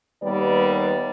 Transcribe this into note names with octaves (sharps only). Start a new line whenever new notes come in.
D#2 G3 B3 A#4 B4 D5